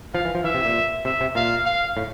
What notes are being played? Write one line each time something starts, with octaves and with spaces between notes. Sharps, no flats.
F3 F5
E3
F3
E3 E5
C3
A#2
C3 E5
C3
A#2 F5
F5
A2